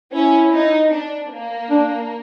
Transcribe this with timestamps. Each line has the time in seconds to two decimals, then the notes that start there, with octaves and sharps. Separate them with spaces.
0.13 C#4 E4
0.53 D#4
0.92 D4
1.32 A#3
1.70 D4